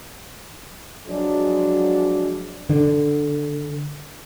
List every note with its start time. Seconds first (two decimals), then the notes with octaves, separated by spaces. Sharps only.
1.07 F3 F#3 G#3 D4
2.69 D3